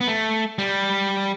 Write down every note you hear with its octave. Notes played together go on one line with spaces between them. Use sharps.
B3
A3
G3